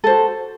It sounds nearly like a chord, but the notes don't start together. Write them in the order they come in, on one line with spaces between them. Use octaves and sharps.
A4 C5 F#4